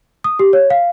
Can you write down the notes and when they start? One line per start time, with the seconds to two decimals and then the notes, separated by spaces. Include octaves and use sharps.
0.24 D#6
0.39 G4
0.53 C#5
0.70 F5